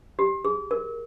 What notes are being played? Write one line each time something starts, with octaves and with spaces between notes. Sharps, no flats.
G4
G#4
A#4